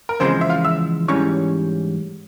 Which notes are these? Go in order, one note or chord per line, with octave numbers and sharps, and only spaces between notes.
A#4
E2 C#3 F3 G#3 C4 C5
E5
F4 F5
E5 E6
G#2 E3 G3 C#4 C#5 C#6